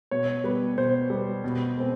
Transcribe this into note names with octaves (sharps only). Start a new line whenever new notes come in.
B2 C#5
G3 B3 B4
B2 C5
G3 B3
B2
G#3 C4